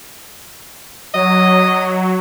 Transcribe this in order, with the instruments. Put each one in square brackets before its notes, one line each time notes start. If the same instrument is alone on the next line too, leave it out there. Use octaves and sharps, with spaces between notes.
[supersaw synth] F#3 [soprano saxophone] D#5